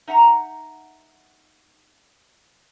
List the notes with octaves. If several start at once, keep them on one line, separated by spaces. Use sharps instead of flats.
D#4 E5 F#5 A#5